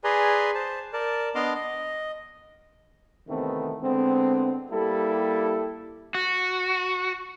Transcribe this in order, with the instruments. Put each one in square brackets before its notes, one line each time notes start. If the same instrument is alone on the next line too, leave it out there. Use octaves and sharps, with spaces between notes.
[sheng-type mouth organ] G#4 B4 D5 G#5 A#5 C6
C5 A5
A#4 D5 A5
B3 D4 D#5 C6 D6 F6
D#5
[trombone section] C3 D#3 E3 A3 B3 C4
D3 G#3 B3 C4
G3 A#3 E4 G4 A4
[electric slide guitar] F#4